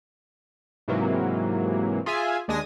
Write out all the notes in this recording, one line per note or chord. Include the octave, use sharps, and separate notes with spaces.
G#2 C3 E3 F#3 A#3
F4 G#4 E5 G#5
D#2 G#3 D4 G#5 D#6 A#6